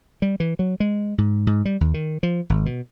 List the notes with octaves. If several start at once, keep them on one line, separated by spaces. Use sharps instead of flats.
G3
E3
F#3
G#3
G#2
G#2
G3
D#2
D#3
F3
G#1
B2